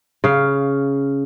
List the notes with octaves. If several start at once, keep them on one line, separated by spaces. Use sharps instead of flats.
C#3 F5